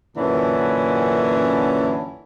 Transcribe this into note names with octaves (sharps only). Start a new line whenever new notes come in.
F#2 A#2 D3 E3 C#4 A5